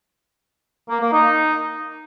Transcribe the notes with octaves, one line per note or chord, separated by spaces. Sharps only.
A#3
A#3
D#4